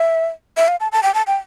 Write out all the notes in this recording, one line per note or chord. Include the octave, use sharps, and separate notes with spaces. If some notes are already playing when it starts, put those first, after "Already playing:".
Already playing: E5
E5
F5
A5
A5
G5
A5
G5